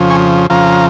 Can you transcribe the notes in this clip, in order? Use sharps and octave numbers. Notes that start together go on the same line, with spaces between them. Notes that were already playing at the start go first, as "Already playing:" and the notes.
Already playing: F2 C#3 F3
G#5 C#6
F2 C#3 F3 F5 A#5